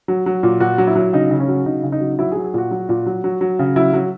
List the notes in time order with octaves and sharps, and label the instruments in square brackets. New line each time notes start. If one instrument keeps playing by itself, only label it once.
[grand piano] F#3
F#3
A#2
A#2 F#4
F#3
E4
F#3
C#3 D#4
C#3
C#4
F#3
C#3 D#4
C#3
D#4
F#3
F#3 E4
G#4
F#3
G#4
A#2 F#4
F#3
A#2
F#3
F#3
F#3
C#3
F#3 E4
F#3